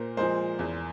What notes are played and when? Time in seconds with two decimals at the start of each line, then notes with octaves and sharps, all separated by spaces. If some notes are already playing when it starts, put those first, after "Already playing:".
Already playing: A#2 A#4 C5
0.17 F3 G#3 A#4 C5
0.59 E2